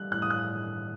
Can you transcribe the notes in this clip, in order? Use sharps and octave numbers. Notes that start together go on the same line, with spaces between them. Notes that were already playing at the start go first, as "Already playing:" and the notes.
Already playing: G3 F#6
A2 F#6
D#6
F#6